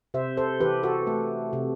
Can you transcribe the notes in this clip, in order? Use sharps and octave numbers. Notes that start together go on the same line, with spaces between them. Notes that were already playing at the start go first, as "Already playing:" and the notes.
C3 C5 E5
A4 C5
E3 G4 B4
F#4 A4
A3
C3